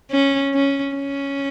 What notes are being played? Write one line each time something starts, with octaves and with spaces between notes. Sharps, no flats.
C#4
C#4
C#4